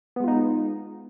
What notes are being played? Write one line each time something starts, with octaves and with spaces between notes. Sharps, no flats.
G#3 B3 D#4 F4